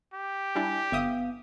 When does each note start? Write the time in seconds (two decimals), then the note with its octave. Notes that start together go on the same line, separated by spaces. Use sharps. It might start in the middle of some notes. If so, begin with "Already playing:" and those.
0.14 G4
0.55 G3 D4 E4 G#5
0.92 G1 B3 E5 F5 D#6